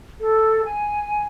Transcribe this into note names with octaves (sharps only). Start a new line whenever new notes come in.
A4
G#5